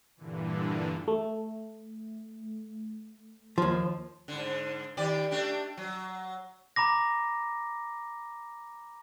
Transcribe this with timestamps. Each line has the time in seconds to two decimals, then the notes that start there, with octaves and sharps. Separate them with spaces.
0.17 G2 A#2 D3 E3
1.08 A3
3.58 D#2 F3
4.28 G#2 D3
4.97 D#3 G4 D5
5.31 A3 D4 G4
5.77 F#3
6.76 A#5 B5 D6 A#6